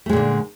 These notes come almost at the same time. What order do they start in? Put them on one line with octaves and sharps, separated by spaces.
A3 G#3 A#2 D3